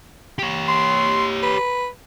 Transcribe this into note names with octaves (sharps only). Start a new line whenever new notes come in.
G4 C#5
C6
B4